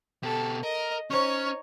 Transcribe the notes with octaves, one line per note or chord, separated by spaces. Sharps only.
B2 G4 A4
A#4 D#5
C#4 D#4 C5 C#5 C#6